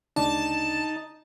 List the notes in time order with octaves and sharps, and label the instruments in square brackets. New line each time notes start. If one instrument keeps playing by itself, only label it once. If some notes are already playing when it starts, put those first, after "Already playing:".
[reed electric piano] D2 C#3 D4 [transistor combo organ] D#4 [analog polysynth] A5